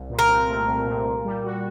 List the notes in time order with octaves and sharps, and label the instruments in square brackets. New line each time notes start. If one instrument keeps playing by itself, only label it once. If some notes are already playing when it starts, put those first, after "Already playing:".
Already playing: [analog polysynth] C2
A#2
[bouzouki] A#4
[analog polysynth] C4
A3
C2
A#2
A#2
G3
F#4